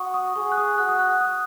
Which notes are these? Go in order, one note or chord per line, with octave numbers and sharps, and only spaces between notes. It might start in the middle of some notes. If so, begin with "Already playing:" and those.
Already playing: F#4 C#6 D#6
D#6
G#4 C#6
F#6
D#6
F#4 F#6
D#6
F#6
D#6